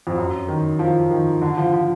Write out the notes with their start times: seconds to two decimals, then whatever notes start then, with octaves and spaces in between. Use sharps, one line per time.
0.07 F2
0.17 F#2
0.48 D#3
0.79 F3
1.10 D#3
1.42 D3
1.57 F3
1.73 F3